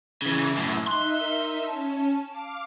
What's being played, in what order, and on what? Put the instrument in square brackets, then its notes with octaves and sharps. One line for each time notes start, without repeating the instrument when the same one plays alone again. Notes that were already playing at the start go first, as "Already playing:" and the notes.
[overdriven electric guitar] C#3 E3
F#2 A2
[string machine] D#4 E5 [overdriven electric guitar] C6 [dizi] F#6
[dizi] A#4
[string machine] C#4 [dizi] A5
[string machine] F5 D6